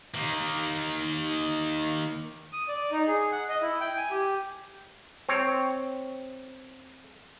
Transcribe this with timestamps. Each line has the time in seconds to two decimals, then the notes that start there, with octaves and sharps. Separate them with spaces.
0.14 D#3 A#3
2.53 D#6
2.68 D5
2.92 D#4
3.07 G#4
3.32 F#5
3.49 D#5
3.61 E4
3.80 G5
3.97 G#5
4.11 G4
5.29 C4 C#5